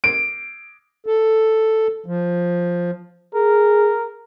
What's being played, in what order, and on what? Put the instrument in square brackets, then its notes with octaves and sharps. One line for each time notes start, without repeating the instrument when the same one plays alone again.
[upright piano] D7
[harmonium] A4
F3
[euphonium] G#4 [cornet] A#4